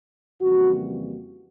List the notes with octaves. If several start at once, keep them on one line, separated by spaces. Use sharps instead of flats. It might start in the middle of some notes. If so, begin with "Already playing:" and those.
F2 C#3 E3 G3 A#3 F#4